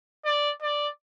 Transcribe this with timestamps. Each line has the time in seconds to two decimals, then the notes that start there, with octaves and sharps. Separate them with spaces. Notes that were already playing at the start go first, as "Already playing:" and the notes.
0.25 D5
0.62 D5